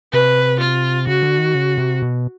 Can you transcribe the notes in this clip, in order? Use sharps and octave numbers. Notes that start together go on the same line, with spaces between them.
C3 B4
F4
C#3 F#4
D3
D#3
C#3
C3
B2